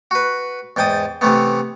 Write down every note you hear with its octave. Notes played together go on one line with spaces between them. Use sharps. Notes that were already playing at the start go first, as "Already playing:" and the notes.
F#4 B4
E2 G#2 G5 A5 D#6
C3 E3 A3 B3